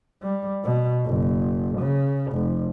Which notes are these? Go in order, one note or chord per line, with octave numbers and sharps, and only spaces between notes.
G3
B2
F#1
C#3
F1